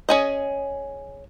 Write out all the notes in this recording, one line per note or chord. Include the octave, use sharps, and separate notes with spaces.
C#4 G#4 D#5